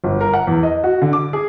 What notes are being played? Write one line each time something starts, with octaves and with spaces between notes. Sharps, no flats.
G1
A#4
F#5
E2
D#5
F#4
D3
D6
G#4